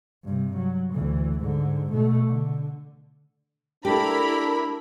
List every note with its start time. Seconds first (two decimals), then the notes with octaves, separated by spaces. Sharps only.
0.25 G2 C3
0.57 F#3
0.93 D2 E3
1.41 G#2 D3
1.91 B2 A3
2.28 D3
3.85 A3 D4 E4 G4 A#4 B5